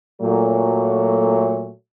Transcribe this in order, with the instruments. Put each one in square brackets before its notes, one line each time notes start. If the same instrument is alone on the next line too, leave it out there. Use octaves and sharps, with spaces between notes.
[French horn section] A#2 F#3 A3